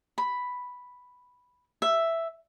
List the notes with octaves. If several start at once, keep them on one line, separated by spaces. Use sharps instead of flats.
B5
E5